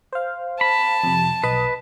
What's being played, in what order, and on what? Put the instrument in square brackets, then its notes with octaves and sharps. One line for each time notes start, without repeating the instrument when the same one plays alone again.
[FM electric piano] C5 F5
[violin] A5 [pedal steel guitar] B5
[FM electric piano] F2 C3
[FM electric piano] B1 D#5 [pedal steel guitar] B4